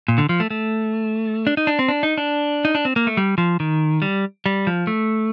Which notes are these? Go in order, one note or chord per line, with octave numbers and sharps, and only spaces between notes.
A#2
D3
F3
A3
A3
D4
D#4
D4
C4
D4
D#4
D4
D#4
D4
C4
A#3
A3
G3
F3
D#3
G3
G3
F3
A3